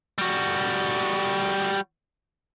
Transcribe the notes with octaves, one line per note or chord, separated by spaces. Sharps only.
G3 F#4